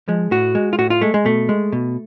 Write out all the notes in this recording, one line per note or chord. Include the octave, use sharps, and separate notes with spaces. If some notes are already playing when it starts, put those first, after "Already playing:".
F3 G#3
A2 F#4
G#3
F4
A2 F#4
F4
G#3 A3
G#3
B2 A3
G#3
B2